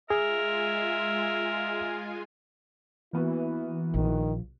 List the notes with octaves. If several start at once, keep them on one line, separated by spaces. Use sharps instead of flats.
G#3 F4 G#4 A#4 E5 G#5
E3 A#3 B3 E4 F#4
A#1 D#3